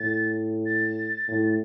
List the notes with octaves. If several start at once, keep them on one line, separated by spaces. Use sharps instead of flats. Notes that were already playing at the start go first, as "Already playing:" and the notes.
Already playing: A2 A6
A6
A2